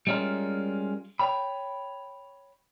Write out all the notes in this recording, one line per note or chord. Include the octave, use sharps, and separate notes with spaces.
G3 G#3 C#4 F4 A#4
C#5 G5 B5